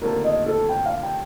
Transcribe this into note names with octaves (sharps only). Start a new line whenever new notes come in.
D#2 D3 A3 C4 F4 A#4
D#5
A4
G5
F5
G5